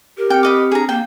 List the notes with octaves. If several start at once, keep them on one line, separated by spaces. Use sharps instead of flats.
G4 A#4
C4 G5 F6 C#7
B4 D#5 D6
D4 G#4 A#5
A#3 G5